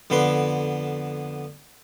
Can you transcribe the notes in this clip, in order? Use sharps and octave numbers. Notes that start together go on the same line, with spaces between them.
F2 D3 B3 D4 B4 C6